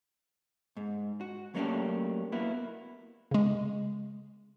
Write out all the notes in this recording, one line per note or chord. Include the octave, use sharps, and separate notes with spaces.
G#2
F#4
F#3 A3 A#3 C#4 D4 G4
A#3 B3 E4 F#4
C#3 G#3